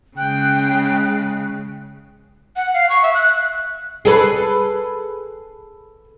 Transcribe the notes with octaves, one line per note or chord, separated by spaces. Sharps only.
C#3 G#3 G5 F#6
F#5
F5
C#6
E5
F#6
G#4 A4 B4